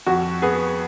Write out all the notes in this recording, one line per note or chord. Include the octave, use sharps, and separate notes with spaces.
F2 F#4
B3 G#4